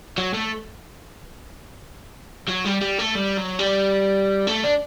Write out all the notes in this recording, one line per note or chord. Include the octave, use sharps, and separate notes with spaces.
F#3
A3
F#3
G3
G3
A3
G3
F#3
G3
A3
D4